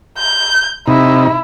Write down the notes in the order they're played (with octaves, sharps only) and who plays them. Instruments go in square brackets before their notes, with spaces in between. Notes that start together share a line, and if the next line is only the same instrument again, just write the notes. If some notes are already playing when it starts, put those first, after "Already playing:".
[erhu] G6
[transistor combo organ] C3 D#4 [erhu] E4